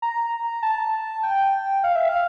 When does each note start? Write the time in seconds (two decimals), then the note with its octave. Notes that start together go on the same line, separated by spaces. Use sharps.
0.02 A#5
0.63 A5
1.23 G5
1.83 F5
1.96 E5
2.09 F5